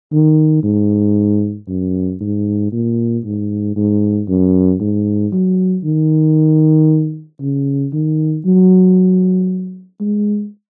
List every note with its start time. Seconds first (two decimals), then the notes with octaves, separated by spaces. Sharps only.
0.12 D#3
0.64 G#2
1.68 F#2
2.21 G#2
2.72 A#2
3.25 G#2
3.76 G#2
4.28 F#2
4.80 G#2
5.32 F#3
5.84 D#3
7.40 C#3
7.93 D#3
8.45 F#3
10.00 G#3